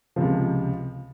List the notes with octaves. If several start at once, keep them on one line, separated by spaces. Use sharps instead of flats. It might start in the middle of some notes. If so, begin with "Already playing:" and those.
C#2 C3 F3